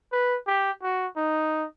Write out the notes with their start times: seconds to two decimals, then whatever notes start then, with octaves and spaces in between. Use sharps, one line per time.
0.12 B4
0.47 G4
0.82 F#4
1.17 D#4